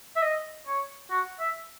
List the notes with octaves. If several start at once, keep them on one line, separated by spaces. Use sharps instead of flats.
E5
D#5
C#5
F#4
E5